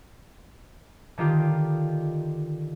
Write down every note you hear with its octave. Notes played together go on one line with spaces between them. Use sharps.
D3 D#3 F4 G4